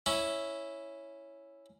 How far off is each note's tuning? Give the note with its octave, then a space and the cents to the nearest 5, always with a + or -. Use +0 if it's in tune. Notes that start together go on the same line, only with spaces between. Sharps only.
C#4 +0 E4 +0